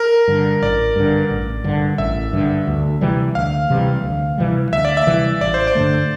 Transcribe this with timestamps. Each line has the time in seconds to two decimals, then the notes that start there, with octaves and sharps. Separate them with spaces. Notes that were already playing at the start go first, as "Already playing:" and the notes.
Already playing: A#4
0.28 G2 D3
0.62 A1 D5
0.96 G2 D3
1.30 A1
1.64 G2 D3
1.98 A1 E5
2.33 G2 D3
2.67 D2
3.01 C3 E3 G3
3.35 D2 F5
3.70 C3 E3 G3
4.04 D2
4.38 C3 E3 G3
4.72 D2 E5
4.85 D5
4.97 E5
5.07 C3 E3 G3
5.41 A1 D5
5.54 C5
5.67 D5
5.75 G2 D3 A3